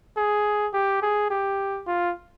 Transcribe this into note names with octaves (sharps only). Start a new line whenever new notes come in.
G#4
G4
G#4
G4
F4